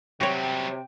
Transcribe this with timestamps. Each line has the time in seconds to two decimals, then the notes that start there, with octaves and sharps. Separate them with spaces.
0.21 C3 F#3 G3 F#4 C#5 G5